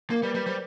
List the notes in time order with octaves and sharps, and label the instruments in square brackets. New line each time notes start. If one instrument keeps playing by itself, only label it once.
[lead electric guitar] A#3 [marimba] A#4
[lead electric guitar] G3 [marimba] B4
[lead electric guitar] G3 [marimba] B4
[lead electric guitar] G3 [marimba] C5